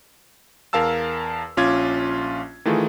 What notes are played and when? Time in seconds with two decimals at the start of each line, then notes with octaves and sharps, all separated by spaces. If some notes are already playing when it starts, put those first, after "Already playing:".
0.73 E2 A#4 F5 A5 E6
1.57 A#1 C#4 F4 D6 G#6
2.65 D#3 E3 A3 F4 G#4